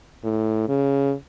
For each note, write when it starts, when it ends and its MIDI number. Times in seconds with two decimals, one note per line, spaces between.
0.24 0.67 45
0.68 1.14 49